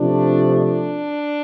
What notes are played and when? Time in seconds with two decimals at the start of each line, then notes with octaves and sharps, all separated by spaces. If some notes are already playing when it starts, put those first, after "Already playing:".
Already playing: C3 F3 A3 D4
0.54 D4